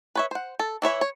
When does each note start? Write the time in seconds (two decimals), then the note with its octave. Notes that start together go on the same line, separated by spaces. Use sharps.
0.15 B4 C#5 E5
0.31 C5 F#5
0.59 A4
0.82 E3 E4 C#5 E5
1.01 C#5